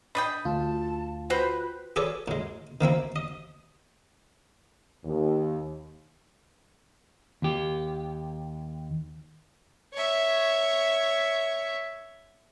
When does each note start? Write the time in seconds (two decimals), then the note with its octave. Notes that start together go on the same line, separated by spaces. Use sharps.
0.15 D4 D#5 G5 B5
0.45 D2 F4 A5
1.30 F#4 B4 C5 G5
1.96 G#4 A4 B4 C#5 D5
2.28 A2 G#3
2.81 D#3 A#3 C4 E4
3.16 D#5
5.05 D#2
7.42 D#2 G4
9.94 C#5 E5